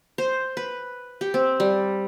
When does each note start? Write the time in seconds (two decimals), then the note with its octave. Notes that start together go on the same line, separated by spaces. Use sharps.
0.18 C5
0.57 B4
1.21 G4
1.34 C4
1.60 G3